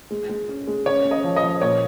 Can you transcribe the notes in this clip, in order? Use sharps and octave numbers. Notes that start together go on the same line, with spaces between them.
G#3
G#3
C#4
G#3
C#4 C#5
C#4
D#5
F3
D#5
F3
A#2 C#5